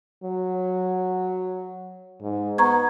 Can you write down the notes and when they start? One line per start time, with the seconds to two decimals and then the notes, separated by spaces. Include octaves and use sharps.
0.24 F#3
2.21 G#2
2.58 B3 A#5 C#6 G#6